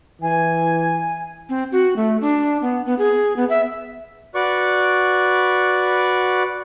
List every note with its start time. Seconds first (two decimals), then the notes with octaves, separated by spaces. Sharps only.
0.22 E3 G#5
1.49 C4
1.72 F#4
1.96 A3
2.21 D4
2.62 B3
2.86 B3
2.99 G#4
3.36 B3
3.50 E5
4.35 F#4 B4 D5 C#6